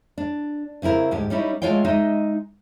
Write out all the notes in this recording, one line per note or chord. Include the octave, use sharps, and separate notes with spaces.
D4
C#3 C4 E4 A#4
D2 G#2 G4
G3 C#4 D#4 E4
G#3 A3 F4 C#5 F5 G5
G#3 D#4 D#5 E5